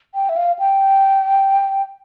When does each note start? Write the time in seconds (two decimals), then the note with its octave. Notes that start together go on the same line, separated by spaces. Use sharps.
0.14 G5
0.29 E5
0.36 F5
0.59 G5